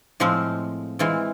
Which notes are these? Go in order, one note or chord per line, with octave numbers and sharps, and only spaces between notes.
A2 F3 G#3 C4 F4
E3 G#3 C4 F4